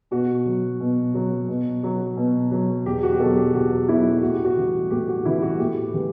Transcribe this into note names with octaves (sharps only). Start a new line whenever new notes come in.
B2 F#4
F#3
B2
F#3
B2
F#3
B2
F#3
E2 G4
F#4
G4
B2 F#3 A4
G4
E2 F#4
B2 F#3 E4
A2 F#4
G4
F#4
E3 G3
A2 G4
F#4
E3 G3 E4
F#4
A2 G4
E3 G3